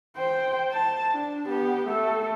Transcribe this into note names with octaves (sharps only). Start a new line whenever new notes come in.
C5 G5
A5
D4
B3 G4
A3 A4